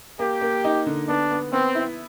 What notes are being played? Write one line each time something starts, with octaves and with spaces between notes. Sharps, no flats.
A#3 G4
A#3
D#4
D3
B3 D4
B3
B3 C4
E4